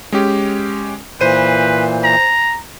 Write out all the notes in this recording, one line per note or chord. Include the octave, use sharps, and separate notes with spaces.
G#3 C#4 G4
A#2 E3 B4 C5 D#7
A#5